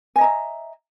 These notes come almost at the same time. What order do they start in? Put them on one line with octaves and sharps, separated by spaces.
G#5 D#5 A#5 E5